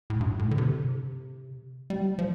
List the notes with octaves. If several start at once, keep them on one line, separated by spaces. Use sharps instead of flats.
A2
G2
A2
D3
C3
G3
F3